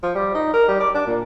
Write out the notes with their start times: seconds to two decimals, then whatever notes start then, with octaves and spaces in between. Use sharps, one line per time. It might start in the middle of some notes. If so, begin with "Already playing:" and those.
0.03 F3
0.15 G3
0.34 D#4
0.53 A#4
0.68 G3
0.80 D5
0.94 D4
1.07 A#2